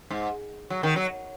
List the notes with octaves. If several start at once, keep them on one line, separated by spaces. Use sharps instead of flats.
G#2
F#3
D#3
F#3